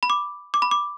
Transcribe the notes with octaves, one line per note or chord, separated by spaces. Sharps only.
B5
D6
D6
B5
D6